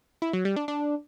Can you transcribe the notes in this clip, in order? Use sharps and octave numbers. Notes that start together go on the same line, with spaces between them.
E4
F#3
G3
D4
D4